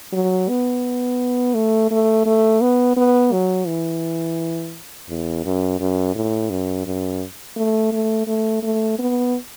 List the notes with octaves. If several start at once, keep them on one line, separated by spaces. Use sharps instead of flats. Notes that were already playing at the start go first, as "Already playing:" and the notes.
F#3
B3
A3
A3
A3
B3
B3
F#3
E3
E2
F#2
F#2
A2
F#2
F#2
A3
A3
A3
A3
B3